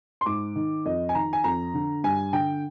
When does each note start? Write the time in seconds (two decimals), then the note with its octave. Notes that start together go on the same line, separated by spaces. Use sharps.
0.21 C6
0.26 G#2 D6
0.55 D#3
0.85 F2 D#5
1.09 G#5
1.14 D#3 A#5
1.33 G#5
1.44 F2 A#5
1.74 D3
2.04 G2 G#5
2.33 D3 G5